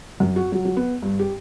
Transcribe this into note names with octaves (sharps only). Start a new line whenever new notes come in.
F#2
F#4
F#3
F#3
B3
G2
G4